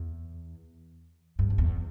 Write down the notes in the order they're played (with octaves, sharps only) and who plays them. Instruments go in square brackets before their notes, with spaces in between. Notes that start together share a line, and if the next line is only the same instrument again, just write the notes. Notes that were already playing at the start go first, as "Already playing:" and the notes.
Already playing: [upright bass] E2
G2
F2
E2